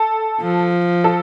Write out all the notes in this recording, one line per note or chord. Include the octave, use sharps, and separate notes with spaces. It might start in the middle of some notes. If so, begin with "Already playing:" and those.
Already playing: A4
F3
A4